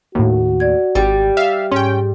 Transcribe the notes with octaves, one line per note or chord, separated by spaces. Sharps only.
D#2 A2 F#4
D5 G#6
G#1 G3
E5 F5
G#2 C#4 G5